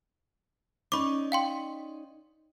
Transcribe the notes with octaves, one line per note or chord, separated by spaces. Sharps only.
C#4 D#4 D5 B5 C#6 D6
F5 G5 C6